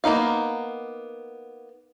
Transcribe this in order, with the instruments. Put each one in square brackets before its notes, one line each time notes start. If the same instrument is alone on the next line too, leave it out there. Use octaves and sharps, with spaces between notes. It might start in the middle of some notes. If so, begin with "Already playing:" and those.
[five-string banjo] A#3 B3 D#4 F5